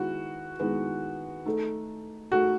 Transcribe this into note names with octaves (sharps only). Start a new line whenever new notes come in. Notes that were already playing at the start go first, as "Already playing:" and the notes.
Already playing: D#3 G#3 B3 E4 F#4 B4
D#3 G#3 B3 E4 B4
A3 D#4 A4
A3 D#4 F#4 A4